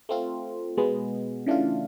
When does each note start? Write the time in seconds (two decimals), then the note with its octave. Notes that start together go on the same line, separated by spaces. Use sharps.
0.09 A3 C4 F4
0.77 B2 G#3 B3
1.46 C#3 E3 A3 D4 F4